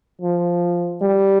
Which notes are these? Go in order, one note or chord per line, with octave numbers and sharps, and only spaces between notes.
F3
G3